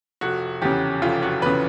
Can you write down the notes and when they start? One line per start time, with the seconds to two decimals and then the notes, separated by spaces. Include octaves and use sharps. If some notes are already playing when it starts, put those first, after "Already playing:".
0.21 F1 F#4
0.62 E2 C#3 G4
1.02 F1 F4
1.22 F#4
1.42 E2 C#3 B4